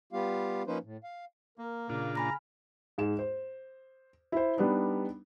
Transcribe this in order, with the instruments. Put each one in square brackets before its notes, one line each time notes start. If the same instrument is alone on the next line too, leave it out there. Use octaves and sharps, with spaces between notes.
[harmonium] G3 B3 F4 G4 F5
F3 A#3 C#4 D#4 B4 C5
A2
F5
[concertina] A#3 [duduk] A#4
[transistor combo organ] A#2 D4 F4 [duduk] C#3
[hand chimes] G#5 B5 F6 [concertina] A#5
[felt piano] G#2 G#4 E7
C5
E4 C5
G3 B3 D4 D#4